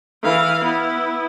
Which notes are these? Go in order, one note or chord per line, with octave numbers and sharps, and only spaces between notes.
E3 F5
B3 E4